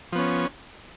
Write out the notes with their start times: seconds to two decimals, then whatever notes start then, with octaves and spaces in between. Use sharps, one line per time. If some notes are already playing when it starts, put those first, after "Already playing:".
0.12 F3
0.15 B3
0.18 C#4